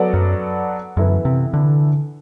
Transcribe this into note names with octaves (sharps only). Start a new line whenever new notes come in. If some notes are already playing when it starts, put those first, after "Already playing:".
Already playing: F#3 B3 F#4 A4 D5
F#2
F#2 E3 B3 E4 A4
C3
D3